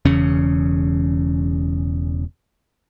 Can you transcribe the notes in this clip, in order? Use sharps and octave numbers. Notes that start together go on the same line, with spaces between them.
E1 E2 C#3 C#4